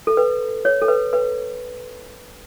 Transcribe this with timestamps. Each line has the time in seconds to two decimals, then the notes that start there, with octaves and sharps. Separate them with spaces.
0.07 A4
0.17 B4
0.65 C#5
0.82 A4
0.88 B4
1.13 B4